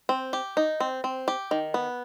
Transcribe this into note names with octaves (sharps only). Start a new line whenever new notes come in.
C4
G4
D#4
C4
C4
G4
D#3
B3